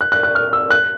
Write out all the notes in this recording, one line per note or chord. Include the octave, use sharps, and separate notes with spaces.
F#6
F#6
F#6
F6
E6
F#6